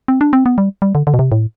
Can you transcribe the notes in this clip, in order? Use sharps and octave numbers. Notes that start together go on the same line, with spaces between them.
C4
D4
C4
B3
G3
G3
D3
D3
B2
C3
A2